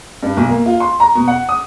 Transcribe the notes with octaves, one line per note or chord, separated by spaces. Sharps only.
G2
B1
A#3
F4
C6
A#5
B2
F#5
D#6